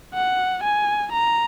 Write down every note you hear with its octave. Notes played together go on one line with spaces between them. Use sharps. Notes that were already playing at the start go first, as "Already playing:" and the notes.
F#5
G#5
A#5